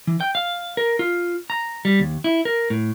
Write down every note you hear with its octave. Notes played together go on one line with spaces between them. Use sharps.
E3
G5
F5
A#4
F4
A#5
G3
D#2
E4
A#4
A2